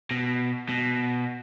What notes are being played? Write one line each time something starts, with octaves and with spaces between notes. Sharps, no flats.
B2
B2